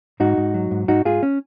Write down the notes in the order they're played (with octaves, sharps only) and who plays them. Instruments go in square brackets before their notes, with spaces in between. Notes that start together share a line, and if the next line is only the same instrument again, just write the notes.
[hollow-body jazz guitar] G#2 D#4 F#4
G#2
F#3
G#2
G#2 D#4 F#4
G#2 F4 G#4
C#4